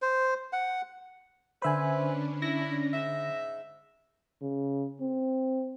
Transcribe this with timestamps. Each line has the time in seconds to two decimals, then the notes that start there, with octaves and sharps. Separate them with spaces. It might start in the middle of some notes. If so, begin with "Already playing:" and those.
0.02 C5
0.53 F#5
1.62 D3 C#4 D4 B4 C5 E5 G#5 B5
2.42 E4 A#6
2.93 G#2 E5
4.42 C#3
5.01 C4